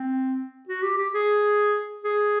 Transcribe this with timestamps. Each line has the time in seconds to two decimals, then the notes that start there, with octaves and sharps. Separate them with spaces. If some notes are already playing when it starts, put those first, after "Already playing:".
Already playing: C4
0.69 F#4
0.83 G4
0.98 G4
1.14 G#4
2.04 G#4